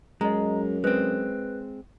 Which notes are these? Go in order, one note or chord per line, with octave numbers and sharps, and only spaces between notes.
F#2 G#3 D#5 A#5
G#3 C4 B4 F#6